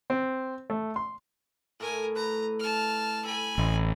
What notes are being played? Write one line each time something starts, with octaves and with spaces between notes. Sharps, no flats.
C4
A3
C6
A2 A3 A#4 G#5
B4 A#5
A5 F6
A4 G#5 B5
A1 C4 D#4 E4